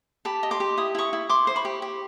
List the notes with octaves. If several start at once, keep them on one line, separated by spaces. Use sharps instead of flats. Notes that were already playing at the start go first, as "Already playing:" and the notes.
G4 A5 B5
D#5
C6 D6
G4
E4 D#6
E4 C#6 D#6
E4
E4 C6 D6
C5
B5 C#6
G4
G4